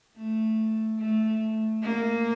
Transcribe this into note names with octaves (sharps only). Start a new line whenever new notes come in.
A3
A3
A#3